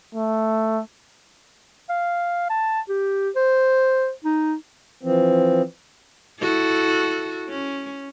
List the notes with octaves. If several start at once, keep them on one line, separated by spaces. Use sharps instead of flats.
A3
F5
A5
G4
C5
D#4
E3 F3 C4
E4 F#4 A4
C#4